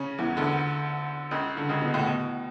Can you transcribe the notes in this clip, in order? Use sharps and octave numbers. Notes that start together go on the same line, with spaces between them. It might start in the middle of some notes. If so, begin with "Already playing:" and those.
Already playing: C#3 C#4
E2 E3
D2 D3
C#2 C#3
D3
C#2 C#3
B2
A2
B2